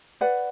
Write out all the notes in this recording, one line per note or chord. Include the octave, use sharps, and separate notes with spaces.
B4 D5 F#5